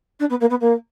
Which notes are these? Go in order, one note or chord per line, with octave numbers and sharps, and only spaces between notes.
D4
B3
A#3
B3
A#3